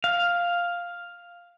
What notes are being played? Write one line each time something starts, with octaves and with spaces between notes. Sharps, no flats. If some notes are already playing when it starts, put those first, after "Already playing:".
F5